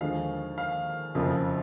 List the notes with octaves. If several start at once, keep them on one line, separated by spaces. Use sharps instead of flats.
D#2 D3 F3 G#3 F5
F5
F#1 F2 C#3 F3